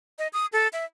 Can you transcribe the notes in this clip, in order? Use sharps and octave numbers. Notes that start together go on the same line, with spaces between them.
D#5
D#6
A4
E5